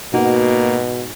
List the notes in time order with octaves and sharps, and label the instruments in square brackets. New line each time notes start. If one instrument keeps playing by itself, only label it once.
[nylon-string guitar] G#2 D#4 F#4 [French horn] B2 [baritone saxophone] A#3